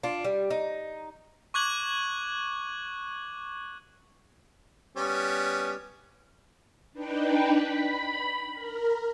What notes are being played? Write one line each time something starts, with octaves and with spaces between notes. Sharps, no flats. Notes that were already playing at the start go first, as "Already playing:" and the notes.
D4 F4
G3
D#4
C#6 D6 F#6 G#6 F#7
G3 B3 C#4
D4 D#4 B4 G5
B5
A#4